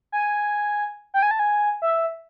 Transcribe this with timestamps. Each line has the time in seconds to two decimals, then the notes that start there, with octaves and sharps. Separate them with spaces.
0.12 G#5
1.14 G5
1.22 G#5
1.31 A5
1.39 G#5
1.82 E5